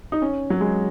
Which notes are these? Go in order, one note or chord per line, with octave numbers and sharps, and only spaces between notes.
D#4
C#4
F#3
G#3